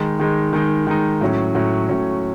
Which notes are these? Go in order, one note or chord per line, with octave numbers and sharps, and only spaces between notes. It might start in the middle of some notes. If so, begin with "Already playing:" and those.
Already playing: D#3 G#3 D#4
D#3 G#3 D#4
D#3 G#3 D#4
D#3 G#3 D#4
A2 F#3 C#4
A2 F#3 C#4
A2 F#3 C#4